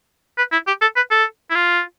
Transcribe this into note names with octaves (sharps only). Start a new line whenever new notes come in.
B4
E4
G4
A4
B4
A4
E4
F4